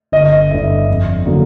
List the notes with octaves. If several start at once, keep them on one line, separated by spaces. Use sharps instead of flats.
G1 D#5
G2 D3 E5
F2
D3 F#3 A#3